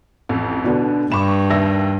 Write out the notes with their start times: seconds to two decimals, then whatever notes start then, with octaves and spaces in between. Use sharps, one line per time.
0.29 A1 F2
0.64 B2 D3 B3 D4 F#4
1.12 G2 B5 C#6 D6 E7
1.50 D#2 D5 E5 E6 A#6